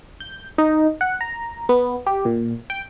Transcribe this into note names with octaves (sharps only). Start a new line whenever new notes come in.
G6
D#4
F#5
A#5
B3
G4
A#2
G5